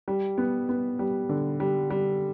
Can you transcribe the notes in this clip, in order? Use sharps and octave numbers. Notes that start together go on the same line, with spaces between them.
G3
B3
B3
G3
D3
G3
G3